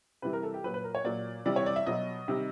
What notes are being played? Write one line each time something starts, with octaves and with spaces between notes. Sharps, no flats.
C3 E3 G3 B4
A#4
A4
G4
A#2 F#3 B4
B4
A#4
C#5
A#2 F#3 D5
C3 E3 G3 D5
C#5
D5
E5
B2 F#3 D#5
C3 D#3 G3